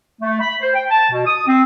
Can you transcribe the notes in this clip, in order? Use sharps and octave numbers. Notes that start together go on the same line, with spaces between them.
A3
B5
C5
G5
A5
B2
D#6
C4